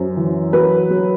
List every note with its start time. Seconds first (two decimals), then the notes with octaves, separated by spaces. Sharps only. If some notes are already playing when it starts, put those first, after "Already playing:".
Already playing: F#2 C5
0.17 E3
0.53 F#3 B4
0.90 F#3